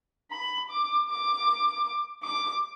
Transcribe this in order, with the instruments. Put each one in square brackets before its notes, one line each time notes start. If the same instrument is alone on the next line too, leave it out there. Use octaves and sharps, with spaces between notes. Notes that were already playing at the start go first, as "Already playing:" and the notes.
[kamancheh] B5
D6
D6
D6